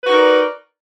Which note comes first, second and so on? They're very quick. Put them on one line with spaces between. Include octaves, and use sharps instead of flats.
B4 F#4 D#4 A#4 D5